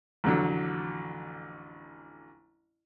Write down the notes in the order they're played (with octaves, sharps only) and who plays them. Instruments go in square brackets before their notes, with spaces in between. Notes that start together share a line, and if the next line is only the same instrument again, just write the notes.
[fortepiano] A1 F2 D3 F#3